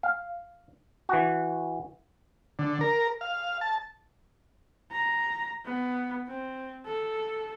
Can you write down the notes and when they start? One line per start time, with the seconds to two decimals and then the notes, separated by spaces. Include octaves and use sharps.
0.03 F5
1.09 E3 F#4
2.59 D3
2.81 A#4
3.21 F5
3.61 A5
4.91 A#5
5.65 B3
6.28 C4
6.86 A4